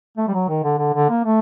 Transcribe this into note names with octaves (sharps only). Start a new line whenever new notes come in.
A3
G3
F#3
D#3
D3
D3
D3
A#3
A3